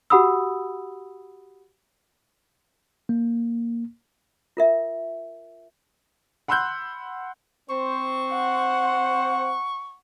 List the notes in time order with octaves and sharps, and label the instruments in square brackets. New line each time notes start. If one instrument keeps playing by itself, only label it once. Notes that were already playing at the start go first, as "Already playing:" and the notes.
[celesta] F#4 G4 F#5 B5 D#6 E6
[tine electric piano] A#3
[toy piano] F4 A#4 E5
[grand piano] F#5 B5 C6 E6 F#6 G6
[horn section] C4 C5 [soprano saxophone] C#6
[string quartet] F#5